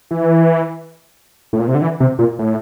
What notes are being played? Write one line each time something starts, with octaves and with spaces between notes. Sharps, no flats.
E3
A2
A#2
C3
D3
E3
C3
A#2
A2